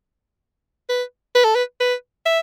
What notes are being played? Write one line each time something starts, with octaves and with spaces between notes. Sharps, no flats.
B4
B4
A4
B4
B4
E5